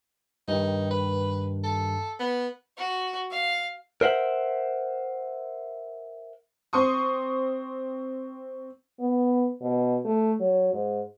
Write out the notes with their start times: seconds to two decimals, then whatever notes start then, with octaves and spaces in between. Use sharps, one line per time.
0.48 G2 D#3 D#4
0.90 B4
1.64 A4
2.19 B3
2.77 F#4
3.31 F5
4.01 A#4 C5 E5 F#5
6.73 C4 C6 C#6 D#6
9.00 B3
9.61 B2
10.05 A3
10.40 F#3
10.73 G#2